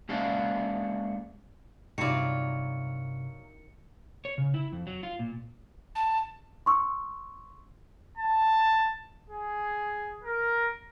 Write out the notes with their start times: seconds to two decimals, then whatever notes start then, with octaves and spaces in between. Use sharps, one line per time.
0.09 G#3 A#3 C#4 G#4 D5 F5
1.98 G2 C3 D#3 F#3 E4 F4 D5 C#7
4.25 C#5
4.38 C#3
4.54 E4
4.73 F2
4.87 F#3
5.03 F4
5.19 A#2
5.95 A5
6.66 C6 C#6 E6
8.18 A5
9.30 G#4
10.23 A#4